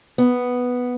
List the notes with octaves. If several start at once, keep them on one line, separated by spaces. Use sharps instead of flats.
B3